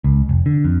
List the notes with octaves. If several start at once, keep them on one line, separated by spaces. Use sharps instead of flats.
C#2
F1
D3
F2